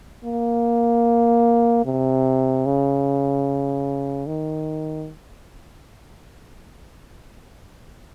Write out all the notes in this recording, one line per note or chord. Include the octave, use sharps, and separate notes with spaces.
A#3
C3
C#3
D#3